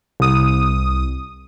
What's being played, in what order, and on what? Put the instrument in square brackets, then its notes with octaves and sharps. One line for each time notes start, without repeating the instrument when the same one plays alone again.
[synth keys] C2 D#6